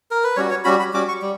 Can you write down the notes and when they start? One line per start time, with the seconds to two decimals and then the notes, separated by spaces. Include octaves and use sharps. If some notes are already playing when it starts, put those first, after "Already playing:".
0.11 A#4
0.24 B4
0.36 G3 C#4 F#4 C#5
0.50 C#5
0.64 G3 C#4 F#4 B5
0.80 B5
0.93 G3 C#4 F#4 D6
1.08 C#6
1.22 G3